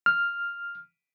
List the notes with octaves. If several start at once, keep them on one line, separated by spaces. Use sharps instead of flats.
F6